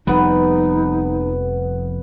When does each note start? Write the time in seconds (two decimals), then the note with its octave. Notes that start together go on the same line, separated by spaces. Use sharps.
0.07 F1 F2 G3 B3 D#4 B4